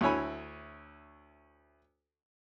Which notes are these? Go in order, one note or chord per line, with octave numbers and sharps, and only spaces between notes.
D2 E4 C#5 G#5 B5